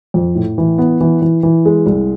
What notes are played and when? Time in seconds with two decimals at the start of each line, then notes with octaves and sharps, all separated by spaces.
0.14 F2
0.35 A2
0.58 E3
0.78 B3
1.01 E3
1.22 E3
1.43 E3
1.65 G#3
1.86 C2